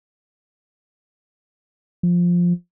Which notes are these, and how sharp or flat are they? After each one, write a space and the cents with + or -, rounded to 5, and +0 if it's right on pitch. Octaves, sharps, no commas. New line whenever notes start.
F3 +5